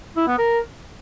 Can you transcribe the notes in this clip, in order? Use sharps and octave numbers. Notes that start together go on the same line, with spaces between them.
E4
B3
A#4